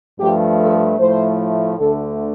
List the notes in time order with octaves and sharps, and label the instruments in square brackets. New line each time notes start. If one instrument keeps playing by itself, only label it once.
[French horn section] G2 F3 A3 G4
A4
A2 F3 A3 C5
D2 D3 A3 A4